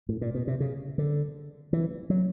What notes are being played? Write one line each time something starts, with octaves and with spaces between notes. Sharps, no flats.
A2
A#2
B2
C3
C#3
D3
E3
F#3